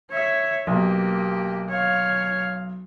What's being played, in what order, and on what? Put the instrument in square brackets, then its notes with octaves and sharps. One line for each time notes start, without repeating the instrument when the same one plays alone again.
[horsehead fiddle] C#5 E5
[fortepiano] B1 [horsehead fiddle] A#3 G4
[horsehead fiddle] C#5 F5